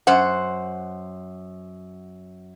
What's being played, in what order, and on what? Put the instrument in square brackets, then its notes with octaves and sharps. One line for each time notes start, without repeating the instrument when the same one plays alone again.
[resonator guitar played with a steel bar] F#2 C5 F#5